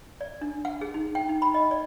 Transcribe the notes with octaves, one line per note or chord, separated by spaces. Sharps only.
D5
D4
F#5
G#4
D#4
G5
D#4
B5
D#5
D5